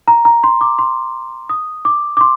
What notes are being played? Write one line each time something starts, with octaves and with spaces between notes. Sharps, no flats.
A#5
A#5
C6
D6
C6
D#6
D6
D6
C6